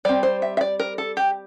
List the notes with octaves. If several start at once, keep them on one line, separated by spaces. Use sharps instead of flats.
G3 C4 D5
C5
E5
E5
D5
A#4
A4
G4